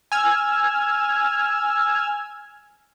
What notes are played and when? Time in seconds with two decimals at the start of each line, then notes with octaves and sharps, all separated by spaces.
0.12 G#5 E6 F6 G#6